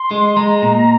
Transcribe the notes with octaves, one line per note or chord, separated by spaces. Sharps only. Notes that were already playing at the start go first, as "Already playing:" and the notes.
Already playing: C6
G#3
G#3 A#5
A#2